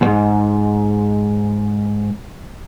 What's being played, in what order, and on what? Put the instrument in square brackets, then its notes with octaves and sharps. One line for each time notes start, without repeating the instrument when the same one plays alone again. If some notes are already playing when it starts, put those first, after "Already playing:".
[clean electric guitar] D2 G#2